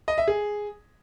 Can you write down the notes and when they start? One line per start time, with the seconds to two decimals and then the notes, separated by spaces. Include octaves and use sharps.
0.08 D#5
0.18 E5
0.28 G#4